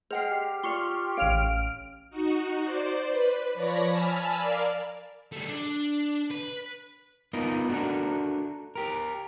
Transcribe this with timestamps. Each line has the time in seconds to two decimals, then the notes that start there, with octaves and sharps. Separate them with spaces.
0.11 G#3 C5 F#5 G5 F6 C7
0.31 G4
0.63 F4 D5 C6 C#6 F6
1.17 A1 C#4 C#5 F5 F6 D7
2.10 D#4 F#4
2.63 C5 D5
3.09 B4
3.54 F3 C#5 D5 B5 A#6
3.90 G#5 A5 B5 E6 F6
4.35 A#4 D5 F5 F6
5.32 G3 A3
5.49 D4
6.31 B4
7.33 B3 D#4 F4 A#4 D#5
7.69 D4 F#4 A4 A#4
8.75 G4 A#4